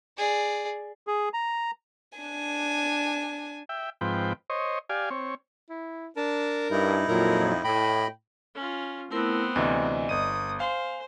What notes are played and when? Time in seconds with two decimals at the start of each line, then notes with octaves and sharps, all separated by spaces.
0.18 G#4 D5
1.07 G#4
1.34 A#5
2.18 D4 G#5
3.69 E5 G5
4.01 G#2 F3 C4 B4 G5
4.50 C5 C#5 D#5
4.89 G4 D5 F5 G#5
5.10 C4 C#5
5.70 E4
6.17 D4 A#4 A5
6.70 G2 D#4 E4
7.08 F2 A#2 F#3 A#4
7.64 A2 D#5 G5 B5
8.55 C#4 F4
9.11 A3 B3 C4 E4 A#4
9.56 D2 C3 E3 D5 D#5
10.09 G1 D#6 D#7
10.60 C5 F5 G#5